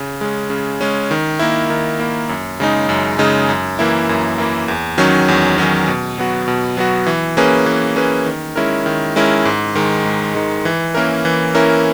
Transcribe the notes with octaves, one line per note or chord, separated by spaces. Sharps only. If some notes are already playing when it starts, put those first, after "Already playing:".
Already playing: C#3
G#3 C#4
C#3
G#3 C#4
D#3
A#3 E4
D#3
A#3 E4
F#2
C#3 G#3 D#4
F#2
C#3 G#3 D#4
F#2
E3 A#3 E4
F#2
E3 A#3 E4
E2
D#3 F#3 C#4
E2
D#3 F#3 C#4
B2
F#3 B3 F#4
B2
F#3 B3 F#4
E3
A#3 C#4 G#4 B4
E3
A#3 C#4 G#4 B4
D#3
G#3 C#4 E4 A#4
D#3
G#3 C#4 E4 A#4
G#2
D#3 G#3
G#2
D#3 G#3
E3
A#3 C#4 E4 A#4
E3
A#3 C#4 E4 A#4